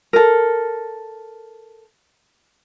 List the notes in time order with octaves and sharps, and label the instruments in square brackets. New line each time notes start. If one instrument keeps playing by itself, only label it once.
[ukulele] A4 A#4